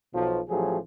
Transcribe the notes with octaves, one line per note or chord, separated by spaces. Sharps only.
B1 B2 F3
A1 F3 F#3 A3 G4 G#4